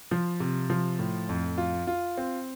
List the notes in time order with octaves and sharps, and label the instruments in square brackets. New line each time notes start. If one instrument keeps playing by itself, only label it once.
[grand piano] F3
C3
F3
A2
F2
F4
F4
C4